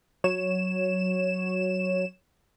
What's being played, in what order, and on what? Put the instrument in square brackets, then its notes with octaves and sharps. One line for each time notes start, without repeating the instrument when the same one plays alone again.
[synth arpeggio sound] F#3 C#5 E7